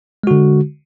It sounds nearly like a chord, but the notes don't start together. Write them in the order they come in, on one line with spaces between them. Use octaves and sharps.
G#3 F#4 D3